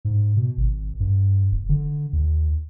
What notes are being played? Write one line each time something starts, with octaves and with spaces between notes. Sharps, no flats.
G#2
B2
G#1
G2
F1
D3
D#2